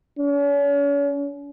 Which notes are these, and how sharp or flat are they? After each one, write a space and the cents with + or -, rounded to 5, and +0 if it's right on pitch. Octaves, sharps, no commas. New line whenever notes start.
C#4 +40